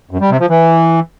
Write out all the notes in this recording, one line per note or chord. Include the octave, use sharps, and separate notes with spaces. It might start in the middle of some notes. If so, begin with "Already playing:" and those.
F#2
G3
C3
F3
E3